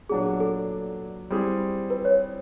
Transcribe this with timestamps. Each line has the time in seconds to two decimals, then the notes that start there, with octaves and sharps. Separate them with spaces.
0.09 A#2 F#3 B3 D4 G#4
0.40 A4
1.30 G3 C4 E4 G#4
1.90 B4
2.05 C#5